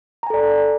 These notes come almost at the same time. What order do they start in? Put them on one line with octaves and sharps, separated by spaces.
A#5 G#5 A4 D5